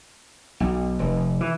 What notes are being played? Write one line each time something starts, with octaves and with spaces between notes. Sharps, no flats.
B1
F1
E3